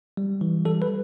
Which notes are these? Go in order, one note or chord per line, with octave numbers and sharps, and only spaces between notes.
G3
E3
G3 A4
B4